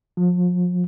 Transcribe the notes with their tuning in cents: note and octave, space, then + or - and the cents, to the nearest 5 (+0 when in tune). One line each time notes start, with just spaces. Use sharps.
F3 +35